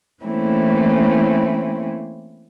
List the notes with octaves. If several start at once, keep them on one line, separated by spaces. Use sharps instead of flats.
E3 A3 A#3 C4 C#4 E4